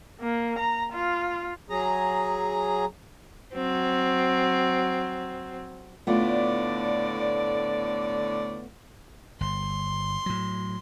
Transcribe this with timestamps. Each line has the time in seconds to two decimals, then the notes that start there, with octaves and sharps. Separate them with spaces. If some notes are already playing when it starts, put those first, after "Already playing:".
0.21 A#3
0.59 A#5
0.93 F4
1.70 F#3 G#4 A#5
3.54 F#3 C4
6.07 A2 D3 A3 B3 F4 D5
9.40 G1 C6
10.26 A2 F#3